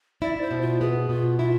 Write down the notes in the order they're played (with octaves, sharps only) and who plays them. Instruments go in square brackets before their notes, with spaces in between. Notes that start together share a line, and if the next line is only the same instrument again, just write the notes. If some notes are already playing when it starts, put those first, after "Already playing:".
[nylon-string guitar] E4 [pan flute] D5
[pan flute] C5
[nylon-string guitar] B2
[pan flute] F4
[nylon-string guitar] B3 [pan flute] G#4
[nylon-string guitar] B2 [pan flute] F4
[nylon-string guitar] E4 [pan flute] F4